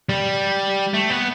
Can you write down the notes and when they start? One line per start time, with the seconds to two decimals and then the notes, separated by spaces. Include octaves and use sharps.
0.09 G3
0.94 A3
1.10 B3